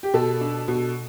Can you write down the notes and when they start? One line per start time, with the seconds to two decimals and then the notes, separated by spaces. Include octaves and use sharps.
0.03 G4
0.14 B2 A4
0.41 D4
0.68 B2